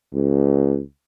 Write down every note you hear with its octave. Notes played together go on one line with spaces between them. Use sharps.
C#2